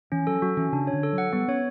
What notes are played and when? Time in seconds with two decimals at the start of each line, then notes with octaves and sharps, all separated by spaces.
0.12 E3 C#4
0.27 F#3 A4
0.42 F#3 F#4
0.57 E3 C#4
0.72 C#3 D4
0.87 C#5
0.93 D3
1.03 A4
1.13 F#3
1.18 F#5
1.33 G3 B3
1.48 C#4 C#5